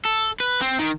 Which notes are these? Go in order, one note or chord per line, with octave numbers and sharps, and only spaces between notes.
A4
B4
C4
D#3